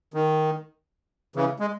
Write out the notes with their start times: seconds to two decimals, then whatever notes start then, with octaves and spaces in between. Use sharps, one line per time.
0.14 D#3
1.36 C#3 E3
1.59 G#3